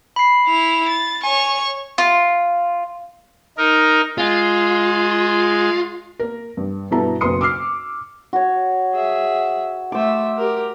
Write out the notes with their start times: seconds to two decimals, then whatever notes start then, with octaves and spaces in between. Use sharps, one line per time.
0.16 B5 C7
0.48 E4 F7
0.88 A6
1.23 C#5 G#5 C#6
1.98 F4
3.58 D#4 A#4
4.18 G#3 F4
6.19 A#3 A#4
6.57 G2
6.91 G2 B2 B3 E4 A4 A#5
7.21 F#1 B1 B3 C6 D#6 C#7
7.41 D6 E6 F6 C7
8.33 F#4 C#5
8.93 G#4 E5
9.92 A3 C5 E5 D6
10.37 G4 A#4